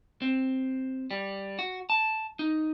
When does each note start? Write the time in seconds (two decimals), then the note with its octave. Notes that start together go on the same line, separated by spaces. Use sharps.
0.22 C4
1.11 G3
1.59 F#4
1.90 A5
2.39 D#4